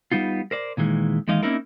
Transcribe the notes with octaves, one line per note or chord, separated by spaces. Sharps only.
G3 B3 D#4 F4
A#4 C5 D5
A#2 D#3 E3 G#3
D#2 E3 G#3 D#4 D#5 F5
A#3 C4 C#4 D#4 E4 A#4